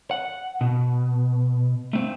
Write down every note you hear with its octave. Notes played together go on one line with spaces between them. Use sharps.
F#5
B2
A3 C4